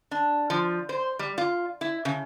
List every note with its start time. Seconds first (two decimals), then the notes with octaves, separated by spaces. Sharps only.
0.11 D4
0.50 F3
0.89 C5
1.19 G3
1.38 F4
1.81 E4
2.05 C#3